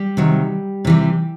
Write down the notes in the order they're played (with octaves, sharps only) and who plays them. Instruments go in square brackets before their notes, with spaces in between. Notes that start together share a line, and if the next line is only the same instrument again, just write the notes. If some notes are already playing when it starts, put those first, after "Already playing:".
Already playing: [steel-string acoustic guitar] G3 G4
C3 D#3 F#3
C3 E3 G3